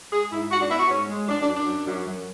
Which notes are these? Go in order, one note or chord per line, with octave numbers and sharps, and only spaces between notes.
G#3 G#4
G#2 E4
G#2 F#4
D4
B3 E4
F#4
G#2 C#4
G#3
F#2 D4
D4
F#2
D4
F#2
F#2
F#2